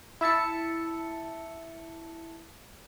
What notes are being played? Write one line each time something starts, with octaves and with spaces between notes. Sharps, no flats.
E4 E5 A5 C#7